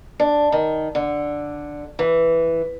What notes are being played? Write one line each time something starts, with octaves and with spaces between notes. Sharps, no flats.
D4
D#3
D3
E3